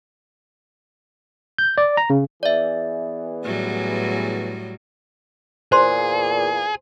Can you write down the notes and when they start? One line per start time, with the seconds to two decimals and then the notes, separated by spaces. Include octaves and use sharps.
1.58 G6
1.78 D5
1.97 A#5
2.10 C#3
2.43 E3 B3 G#4 D5 E5
3.43 A2 F#3 G3
5.72 E2 A#2 G#4 C5 C6